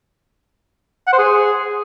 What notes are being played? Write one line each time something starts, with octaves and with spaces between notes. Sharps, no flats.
F#5
C5
G#4